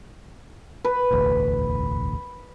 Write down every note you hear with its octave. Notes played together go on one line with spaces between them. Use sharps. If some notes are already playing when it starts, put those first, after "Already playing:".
B4
E1 A1 D2